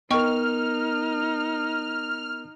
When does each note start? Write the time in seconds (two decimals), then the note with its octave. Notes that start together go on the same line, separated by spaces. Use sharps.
0.11 B3 D#4 A#4 D#5 G5 C#6 F6